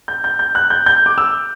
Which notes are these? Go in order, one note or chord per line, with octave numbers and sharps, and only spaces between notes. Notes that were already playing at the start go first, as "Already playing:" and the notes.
G6
G6
G6
F#6
G6
G6
D6
E6